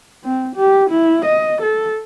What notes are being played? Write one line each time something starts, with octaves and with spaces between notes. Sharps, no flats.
C4
G4
E4
D#5
A4